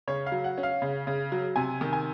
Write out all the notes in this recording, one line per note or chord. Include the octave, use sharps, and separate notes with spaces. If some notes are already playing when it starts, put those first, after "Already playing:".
C#3 C#5
F5
F#3
F#5
C#4
F5
C#3
C#3
F#3
C3 G#5
D#3
G#5